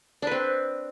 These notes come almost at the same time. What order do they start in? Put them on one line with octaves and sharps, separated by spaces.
D4 B4 C4